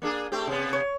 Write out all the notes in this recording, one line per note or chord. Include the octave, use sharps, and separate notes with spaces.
A#3 D4 G#4
A3 C4 G4
C3 B3
C#5